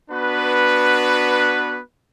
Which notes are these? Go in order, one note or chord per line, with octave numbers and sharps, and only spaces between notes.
B3 D4 F#4 B4